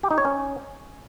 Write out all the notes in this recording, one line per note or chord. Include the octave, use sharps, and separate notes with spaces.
G4
D#4
C#5
C#4